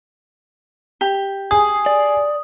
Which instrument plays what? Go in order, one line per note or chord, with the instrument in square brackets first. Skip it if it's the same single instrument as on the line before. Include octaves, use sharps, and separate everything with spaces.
[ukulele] G4
[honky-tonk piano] G#4 [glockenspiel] D#6
[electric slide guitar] D5